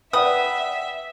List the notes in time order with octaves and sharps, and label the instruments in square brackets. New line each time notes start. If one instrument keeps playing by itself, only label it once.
[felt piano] B4 [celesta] D5 F#5 G5 [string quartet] E5 [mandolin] D#6